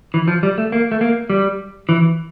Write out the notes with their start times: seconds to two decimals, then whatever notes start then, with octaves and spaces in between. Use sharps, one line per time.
0.14 E3
0.28 F3
0.43 G3
0.58 A3
0.72 A#3
0.91 A3
1.01 A#3
1.30 G3
1.89 E3